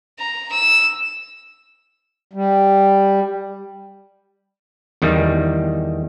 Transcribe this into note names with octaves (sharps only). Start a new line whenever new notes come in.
A#5
E6
G3
E2 D#3 G3